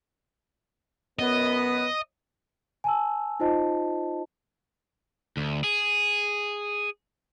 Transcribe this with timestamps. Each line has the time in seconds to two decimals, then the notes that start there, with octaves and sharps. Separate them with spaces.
1.19 F#2 B3 B4 D#5
2.84 G#5 A5 E6
3.40 D#4 F4 C5 D#5 A5
5.37 D2
5.64 G#4